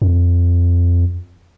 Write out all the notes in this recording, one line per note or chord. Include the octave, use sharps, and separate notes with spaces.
F2